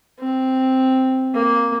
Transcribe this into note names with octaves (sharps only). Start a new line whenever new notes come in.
C4
A#3